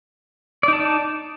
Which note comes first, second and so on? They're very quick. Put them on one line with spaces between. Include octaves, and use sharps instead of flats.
D5 D#4 A5